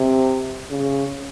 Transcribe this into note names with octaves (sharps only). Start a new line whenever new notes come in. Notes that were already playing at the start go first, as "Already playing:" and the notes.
Already playing: C3
C#3